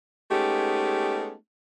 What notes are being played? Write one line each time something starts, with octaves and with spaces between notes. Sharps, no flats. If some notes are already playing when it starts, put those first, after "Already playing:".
G#3 A3 B3 C#4 D#4 G4